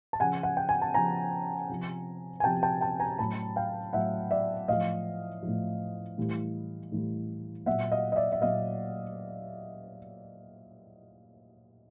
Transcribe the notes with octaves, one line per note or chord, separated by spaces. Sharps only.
A5
C#3 F3 F#5 G#5
F#5
G5
G#5
A5
C#3 F3 G#5 A#5
C3 F3
G#5
C3 F3 G5 A5
G5 A5
G5 A5
G#5 A#5
A2 F#3 A5 B5
F5 G5
A2 F#3 E5 F#5
D5 E5
A2 F3 D#5 F5
A2 F3
A2 E3 G3
A2 E3 G3
A#2 F#3 E5 F#5
D#5 F5
D#5
D5 E5
E5
A#2 F#3 D#5 F5